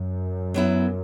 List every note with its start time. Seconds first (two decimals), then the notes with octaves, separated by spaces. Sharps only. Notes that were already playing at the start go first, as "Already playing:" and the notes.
Already playing: F#2
0.54 F#3 B3 E4